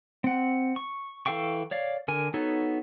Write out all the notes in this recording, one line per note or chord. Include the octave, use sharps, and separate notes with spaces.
C4 F#5
C#6
E3 A4 F5 G5 C#6
C#5 D5 F5
D3 A#4 G#5
B3 D#4 F#4 A4 C#5